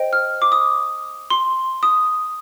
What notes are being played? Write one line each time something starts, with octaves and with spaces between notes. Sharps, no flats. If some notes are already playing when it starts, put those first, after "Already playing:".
Already playing: C5 D#5 G5
F6
D6
D#6
C6
D#6